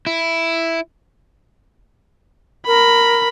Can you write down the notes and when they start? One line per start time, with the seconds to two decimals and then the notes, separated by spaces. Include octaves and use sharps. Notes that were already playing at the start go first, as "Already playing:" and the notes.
0.07 E4
2.67 A#4 B5